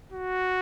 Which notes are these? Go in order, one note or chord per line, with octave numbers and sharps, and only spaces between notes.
F#4